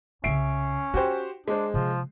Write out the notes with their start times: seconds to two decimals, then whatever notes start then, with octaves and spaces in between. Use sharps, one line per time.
0.24 C2 C#3 C#4 E5 C7 D7
0.94 D#4 F#4 G4 C5
1.48 G#3 D4 C5
1.74 C3 F3